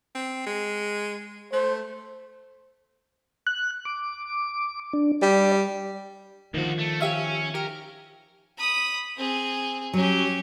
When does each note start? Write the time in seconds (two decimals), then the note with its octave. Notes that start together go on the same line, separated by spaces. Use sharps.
0.15 C4
0.46 G#3
1.53 A3 C5
3.47 F#6
3.85 D6
4.93 D4
5.22 G3 D5
6.54 D2 D#3 F3 F#4
6.78 A3
7.00 C#4 G4 E5 F5
7.55 G4 A#4
8.58 B5 D#6
9.17 C4 G#4
9.94 F#3 C#4 G4